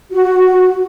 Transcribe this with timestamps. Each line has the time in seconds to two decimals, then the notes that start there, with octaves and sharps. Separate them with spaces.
0.11 F#4